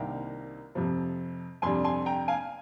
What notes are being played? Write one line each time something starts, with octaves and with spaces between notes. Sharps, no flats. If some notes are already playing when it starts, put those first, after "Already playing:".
Already playing: C2 C3 D#3 A#3 D4 G5 A#5
F2 C3 F3
F2 C3 G3 D4 G#5 C6
G#5 C6
G5 A#5
F5 G#5